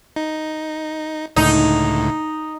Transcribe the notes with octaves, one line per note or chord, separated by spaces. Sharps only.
D#4
C#2 A2 D3 D#4